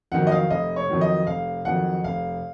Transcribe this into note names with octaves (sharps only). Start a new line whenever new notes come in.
F2 D#3 F#3 F#5
D#5
F5
F1 D#5
C#5
F2 D#3 F#3
D#5
F1 F5
F2 D#3 F#3 F#5
F1 F5